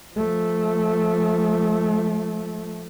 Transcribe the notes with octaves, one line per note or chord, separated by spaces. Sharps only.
F3 A3